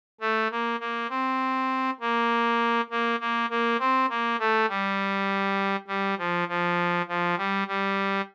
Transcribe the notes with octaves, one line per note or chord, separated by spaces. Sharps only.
A3
A#3
A#3
C4
A#3
A#3
A#3
A#3
C4
A#3
A3
G3
G3
F3
F3
F3
G3
G3